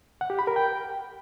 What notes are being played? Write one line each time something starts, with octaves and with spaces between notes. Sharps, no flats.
F#5
G4
B5
A#4
G5